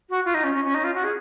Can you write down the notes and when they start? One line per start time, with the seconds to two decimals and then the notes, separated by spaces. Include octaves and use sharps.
0.09 F#4
0.25 F4
0.34 D#4
0.43 C#4
0.54 C#4
0.64 C#4
0.74 D#4
0.84 F4
0.94 F#4
1.03 G#4